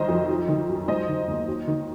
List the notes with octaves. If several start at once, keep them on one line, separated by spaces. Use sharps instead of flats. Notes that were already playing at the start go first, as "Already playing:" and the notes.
Already playing: C2 D#3 F#3 C5 D#5
F2
F#3
D#3
F#2
G#3 C5 D#5
D#3
D#2
F#3
D#3